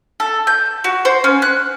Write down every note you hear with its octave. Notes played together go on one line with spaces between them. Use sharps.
A4
G6
F#4
C5
C#4
F#6